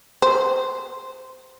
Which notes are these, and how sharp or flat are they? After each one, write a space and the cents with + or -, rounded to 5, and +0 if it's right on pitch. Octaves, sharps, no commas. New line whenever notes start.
C5 -15